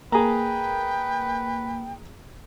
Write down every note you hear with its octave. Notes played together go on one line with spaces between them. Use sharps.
A#3 G#4 B4 G5 A#5